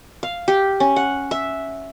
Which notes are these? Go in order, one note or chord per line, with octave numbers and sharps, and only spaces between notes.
F5
G4
C#4
F#5
E5